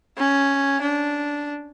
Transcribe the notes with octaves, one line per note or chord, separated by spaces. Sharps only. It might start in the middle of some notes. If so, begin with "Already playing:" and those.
C#4
D4